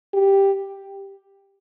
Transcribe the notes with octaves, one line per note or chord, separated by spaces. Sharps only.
G4